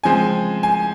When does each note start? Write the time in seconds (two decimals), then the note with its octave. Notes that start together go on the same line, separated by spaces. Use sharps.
0.04 C#3 F3 G#3 C4 G#5
0.63 G#5